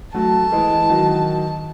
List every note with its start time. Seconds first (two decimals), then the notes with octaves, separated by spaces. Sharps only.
0.14 F#3 A3 A5
0.52 E3 G#3
0.90 D#3 F#3